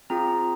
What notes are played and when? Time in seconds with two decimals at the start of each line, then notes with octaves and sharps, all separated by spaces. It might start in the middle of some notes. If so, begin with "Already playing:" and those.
0.10 C4 F4 G#4 A#5
0.28 A#5